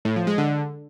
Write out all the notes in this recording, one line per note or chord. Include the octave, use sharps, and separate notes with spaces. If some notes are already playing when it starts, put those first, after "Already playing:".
A2
F3
G#3
D3